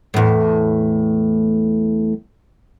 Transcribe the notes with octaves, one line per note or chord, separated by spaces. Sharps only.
E2 A2